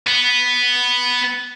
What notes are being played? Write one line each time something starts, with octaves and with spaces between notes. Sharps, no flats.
B3